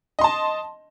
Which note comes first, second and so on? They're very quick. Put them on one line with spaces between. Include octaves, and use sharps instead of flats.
D#5 C6 A5